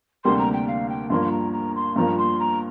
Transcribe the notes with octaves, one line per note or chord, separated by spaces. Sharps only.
D2 C3 G3 A#3 C6
A#5
G5
F5
G5
G2 F3 A#3 C6
A#5
A#5
C6
G2 F3 A#3 A#5
C6
A#5